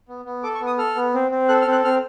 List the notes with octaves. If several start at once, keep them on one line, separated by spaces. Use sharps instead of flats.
B3
B3
A4 D6
C#6
B3
D#6
A4 F6
B3
C4
C4
A4 F#6
F6
C4 F#6
C4 F6